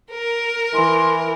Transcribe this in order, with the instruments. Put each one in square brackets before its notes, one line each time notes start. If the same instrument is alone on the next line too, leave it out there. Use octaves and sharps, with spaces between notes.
[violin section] A#4
[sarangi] E3 [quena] C6